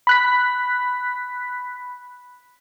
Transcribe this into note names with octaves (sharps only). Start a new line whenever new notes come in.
B5 F#6 B6